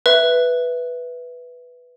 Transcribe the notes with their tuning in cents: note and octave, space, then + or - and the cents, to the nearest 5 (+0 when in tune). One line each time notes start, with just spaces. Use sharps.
B4 +0 E5 +0